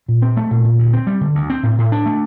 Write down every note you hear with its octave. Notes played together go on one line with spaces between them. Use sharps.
A#2
C4
A3
A#2
A#2
D2
C4
G3
D3
D2
C4
A2
A2
D4
A3